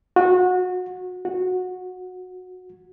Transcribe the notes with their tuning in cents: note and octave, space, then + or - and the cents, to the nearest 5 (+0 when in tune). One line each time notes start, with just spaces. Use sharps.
F#4 -25
F#4 -15